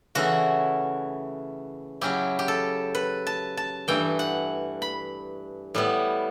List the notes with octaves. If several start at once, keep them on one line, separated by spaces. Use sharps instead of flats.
C#3 E3 A3 E4 F#4
C#3 F#3 C#4 E4 G4
G4
A4
B4
A5
A5
G2 E3 A3 E4 G5
F#5
B5
A2 G3 B3 E4